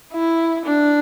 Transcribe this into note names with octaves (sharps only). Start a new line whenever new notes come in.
E4
D4